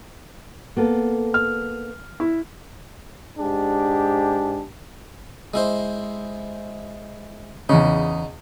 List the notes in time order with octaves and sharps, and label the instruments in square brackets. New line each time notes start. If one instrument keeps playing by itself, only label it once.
[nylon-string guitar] A#3 B3 A4
[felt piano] F6
E4
[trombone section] G#2 D4 G4 G#4
[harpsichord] G#3 E4 C5
[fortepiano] E2 C#3 [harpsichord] D#4